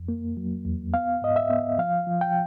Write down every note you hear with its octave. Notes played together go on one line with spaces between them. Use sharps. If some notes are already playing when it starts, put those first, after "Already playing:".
Already playing: F2
A#3
F#3
E2
B3 F5
G#2 D#5
E5
B3
F3 F5
F3
G5